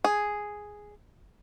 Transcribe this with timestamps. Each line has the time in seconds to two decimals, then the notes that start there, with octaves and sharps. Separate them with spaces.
0.04 G#4